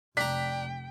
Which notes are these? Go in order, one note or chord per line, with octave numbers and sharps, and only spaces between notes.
F1 D4 G5 A#5 B6